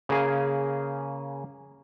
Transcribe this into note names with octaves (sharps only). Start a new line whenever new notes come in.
C#3 A#3 G#4 G#5